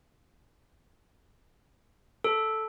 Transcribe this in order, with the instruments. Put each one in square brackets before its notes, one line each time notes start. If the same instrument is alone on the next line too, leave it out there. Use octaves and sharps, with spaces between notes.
[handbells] A4